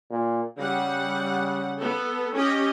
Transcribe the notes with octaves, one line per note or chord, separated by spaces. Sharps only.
A#2
C#3 G3 F#5
B3 A4
C#4 G4 D#5